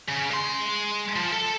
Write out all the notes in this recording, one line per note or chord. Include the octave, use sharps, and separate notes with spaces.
C#3
G#3 C6
F3
A4